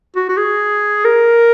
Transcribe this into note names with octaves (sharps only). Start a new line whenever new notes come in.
F#4
F#4
G#4
A#4